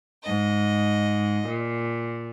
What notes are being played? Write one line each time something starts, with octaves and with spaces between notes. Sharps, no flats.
G#2 D#5
A#2